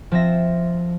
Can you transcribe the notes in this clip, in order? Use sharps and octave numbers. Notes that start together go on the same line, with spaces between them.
F3 C4 E5 A#6